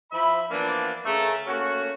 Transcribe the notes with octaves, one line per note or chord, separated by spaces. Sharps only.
F3 E4 E5 B5
E3 F3 A#3 B3 D4
C#3 A3 A#4
A3 A#3 C#4 F#4